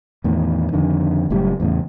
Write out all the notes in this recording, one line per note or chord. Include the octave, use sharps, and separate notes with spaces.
E2 A2 D#3
F2 D3 D#3
F#1 F#2 A2 G3
E2 A2 C#3